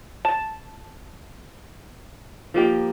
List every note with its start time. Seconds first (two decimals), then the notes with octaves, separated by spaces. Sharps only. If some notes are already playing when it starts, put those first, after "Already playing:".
0.25 A5
2.54 F3 A#3 G4